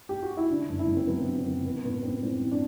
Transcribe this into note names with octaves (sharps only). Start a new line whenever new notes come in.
G4
F#4
E4
D3 D4
F#1
E4
F#2
C4
F#3 B3
D3
C4
F#1
E3 B3
A1 B3
G2 C4
A1 C4
E3
D4